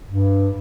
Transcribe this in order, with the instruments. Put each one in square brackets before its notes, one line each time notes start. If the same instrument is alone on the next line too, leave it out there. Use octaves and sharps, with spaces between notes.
[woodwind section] G2